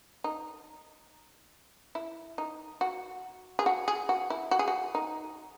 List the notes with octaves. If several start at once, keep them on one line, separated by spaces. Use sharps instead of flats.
D#4
E4
D#4
F#4
G#4
F#4
G#4
F#4
E4
F#4
G#4
F#4
D#4